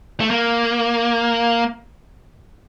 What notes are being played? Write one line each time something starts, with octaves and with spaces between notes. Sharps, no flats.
A3
A#3